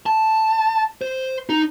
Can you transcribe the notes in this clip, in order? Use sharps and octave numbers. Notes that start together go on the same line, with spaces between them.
A5
C5
D#4